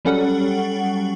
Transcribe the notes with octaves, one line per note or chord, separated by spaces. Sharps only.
F#3 G3 C#4 A4 F#5